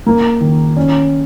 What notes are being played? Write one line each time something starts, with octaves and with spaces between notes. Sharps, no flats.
A#3
D#3
C#4